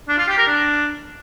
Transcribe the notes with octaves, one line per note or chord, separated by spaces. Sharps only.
D4
F4
G4
A#4
D4